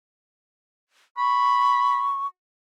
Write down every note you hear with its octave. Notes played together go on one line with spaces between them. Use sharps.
B5 C#6